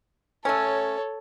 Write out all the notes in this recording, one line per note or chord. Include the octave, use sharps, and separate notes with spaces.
A3 C#4 A4 C#5